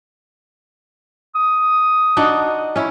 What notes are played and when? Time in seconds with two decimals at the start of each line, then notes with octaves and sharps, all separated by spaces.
1.35 D#6
2.17 D4 D#4 F#4
2.76 C#4 E4